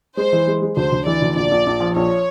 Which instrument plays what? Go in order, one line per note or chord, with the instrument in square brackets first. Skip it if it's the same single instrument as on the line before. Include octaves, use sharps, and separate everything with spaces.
[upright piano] G#3 [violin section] C5
[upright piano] E3
G#3
G#3
[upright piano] D2 [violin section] C5
[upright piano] D2
[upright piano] E3 [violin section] D5
[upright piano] D2
[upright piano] A#1 [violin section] D5
[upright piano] A#1
A#1
F3
[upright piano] A#1 [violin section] C#5